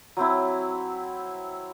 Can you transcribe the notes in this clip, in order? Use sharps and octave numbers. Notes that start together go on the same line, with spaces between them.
F#3 C4 E4